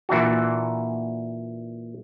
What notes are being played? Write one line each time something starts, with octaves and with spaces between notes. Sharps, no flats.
A#2 E3 D4 F#4